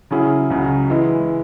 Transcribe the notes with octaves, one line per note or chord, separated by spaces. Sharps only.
C#3 F#3 C#4 E4 G#4
C#2 C#3 F#3
E3 G#3 E4